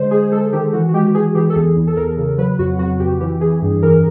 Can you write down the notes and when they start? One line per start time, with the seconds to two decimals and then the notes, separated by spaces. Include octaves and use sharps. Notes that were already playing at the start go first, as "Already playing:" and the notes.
Already playing: D3 G#3 C5
0.11 G#3 G#4
0.23 G#4
0.32 G#3 A4
0.53 D#3 G4
0.73 E3 F#4
0.89 F#4
0.94 G#3 G4
1.07 G4
1.14 E3 G#4
1.35 E3 G4
1.50 A4
1.56 E2 G#4
1.76 E2
1.87 A4
1.97 E2 A#4
2.17 C#3
2.38 F#3 B4
2.59 F2 F#4
2.79 F2 F#4
3.00 F2 G4
3.20 E3 G4
3.41 E3 G#4
3.62 G2
3.83 E3 A#4